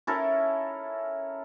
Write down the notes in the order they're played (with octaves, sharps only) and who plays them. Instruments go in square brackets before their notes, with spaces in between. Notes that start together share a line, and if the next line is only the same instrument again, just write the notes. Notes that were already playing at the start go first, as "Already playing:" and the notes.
[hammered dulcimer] C#4 E4 A4 A#4